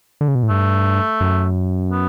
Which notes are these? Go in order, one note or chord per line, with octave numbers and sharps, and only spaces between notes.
D3
C#3
B2
A2
G2 A3
F#2
B3